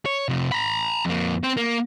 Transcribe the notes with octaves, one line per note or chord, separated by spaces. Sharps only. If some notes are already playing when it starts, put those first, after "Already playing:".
C#5
C3 F3
A#5 B5
F2 A#3
C4
A#3